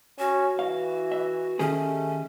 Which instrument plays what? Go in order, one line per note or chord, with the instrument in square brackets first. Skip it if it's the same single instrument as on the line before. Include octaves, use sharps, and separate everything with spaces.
[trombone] C#4 [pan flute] F#4
[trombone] E3 [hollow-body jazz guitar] F5
[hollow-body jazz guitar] E5
[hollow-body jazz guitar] D#3 G4 G#4 [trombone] A3 [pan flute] C#4